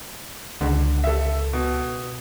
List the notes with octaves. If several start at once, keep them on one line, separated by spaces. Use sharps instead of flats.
C#2 D3
A4 E5
B2